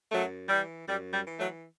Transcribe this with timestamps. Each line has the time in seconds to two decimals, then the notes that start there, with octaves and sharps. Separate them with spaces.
0.12 F#2 F#3 A3
0.49 E3 G3
0.87 F#2 G3
1.13 G3
1.26 E3
1.39 F#3 A3